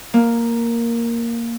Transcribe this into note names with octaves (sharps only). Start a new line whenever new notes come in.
A#3